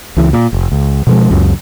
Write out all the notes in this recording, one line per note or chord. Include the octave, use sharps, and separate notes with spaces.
C#2 E3
A#2
F1
C#2
B2 F3 G#3
C#2 F#2